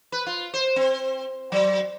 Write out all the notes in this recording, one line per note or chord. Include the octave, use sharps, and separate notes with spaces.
B4
F4
C5
C4
F#3